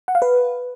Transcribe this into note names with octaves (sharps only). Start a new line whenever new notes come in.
F#5
F5
B4